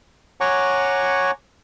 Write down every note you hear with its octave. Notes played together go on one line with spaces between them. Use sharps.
C#5 F#5 G#5 A#5 C#6 D6